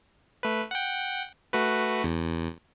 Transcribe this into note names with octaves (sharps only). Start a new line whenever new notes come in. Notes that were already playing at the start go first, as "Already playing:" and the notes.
A3 B4
F#5 G5
A3 F#4 B4
E2